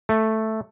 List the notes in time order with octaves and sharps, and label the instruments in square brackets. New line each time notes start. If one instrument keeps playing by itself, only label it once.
[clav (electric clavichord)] A3